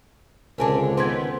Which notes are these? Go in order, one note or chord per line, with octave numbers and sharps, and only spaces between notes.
C#2 D3 C4 C#4 A#4 G#5 A5
D#3 B3 C4 C6 G#6